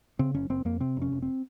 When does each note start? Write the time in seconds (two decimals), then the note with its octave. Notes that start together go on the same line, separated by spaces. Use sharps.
0.19 C#3 C4
0.34 F#1 C#4
0.50 F#1 C4
0.65 F2 A#3
0.80 C3 C4
0.97 F1 C#4
1.12 F1
1.22 C4